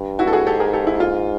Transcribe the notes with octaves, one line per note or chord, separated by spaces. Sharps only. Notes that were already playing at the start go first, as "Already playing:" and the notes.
Already playing: G2
E4 F#4
A4
F#4 G#4
G#2 G4 A4
G#4 A#4
G4 A4
E4
F4